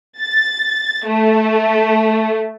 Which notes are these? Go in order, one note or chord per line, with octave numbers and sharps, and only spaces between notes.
A6
A3